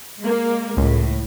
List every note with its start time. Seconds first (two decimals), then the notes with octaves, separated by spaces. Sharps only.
0.21 G#3 A#3
0.77 C#2 A2